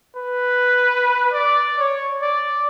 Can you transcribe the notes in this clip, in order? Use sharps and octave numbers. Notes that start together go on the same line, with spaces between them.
B4
D5
C#5
D5